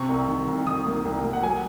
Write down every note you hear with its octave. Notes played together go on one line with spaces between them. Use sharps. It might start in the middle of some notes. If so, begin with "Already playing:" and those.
Already playing: C3 C#6
C2
D#3
C2
D#3 D#6
A#3
C2
A#3
F#5
F#3 G#5